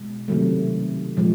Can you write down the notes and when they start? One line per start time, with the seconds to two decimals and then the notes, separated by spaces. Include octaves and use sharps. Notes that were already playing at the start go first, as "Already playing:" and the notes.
Already playing: B2 G#3
0.28 C3 D#3 F#3 A3
1.17 A#2 F3 G#3